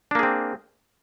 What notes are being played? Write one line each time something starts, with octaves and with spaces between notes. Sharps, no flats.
A#3 C4 D4 G#4